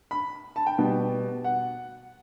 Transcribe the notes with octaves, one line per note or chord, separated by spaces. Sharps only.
B5
A5
G5
B2 G3 B3
F#5